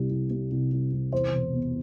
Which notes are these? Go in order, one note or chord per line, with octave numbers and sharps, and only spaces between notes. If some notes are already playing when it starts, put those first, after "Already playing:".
Already playing: C2 C3 G3
C2
C3
C2
G3
C2
E2 C5
E1
B2